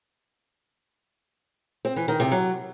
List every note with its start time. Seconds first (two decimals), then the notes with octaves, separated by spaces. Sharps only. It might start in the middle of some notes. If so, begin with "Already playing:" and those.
1.85 C4
1.96 E3
2.08 D#3
2.20 C3
2.31 F#3